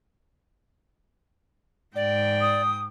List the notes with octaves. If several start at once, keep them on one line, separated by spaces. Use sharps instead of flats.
G#2 D5 G5
D#6